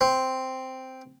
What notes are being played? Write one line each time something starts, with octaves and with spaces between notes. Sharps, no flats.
C4